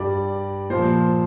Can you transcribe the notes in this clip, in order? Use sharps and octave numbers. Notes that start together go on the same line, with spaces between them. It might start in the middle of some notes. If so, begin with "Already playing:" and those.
Already playing: G2 G3 D5
A#2 F3 C5